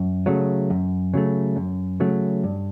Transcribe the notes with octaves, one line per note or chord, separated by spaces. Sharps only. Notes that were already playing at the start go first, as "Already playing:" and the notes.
Already playing: F#2
C#3 F#3 A3
F#2
C#3 F#3 A3
F#2
C#3 F#3 A3
G2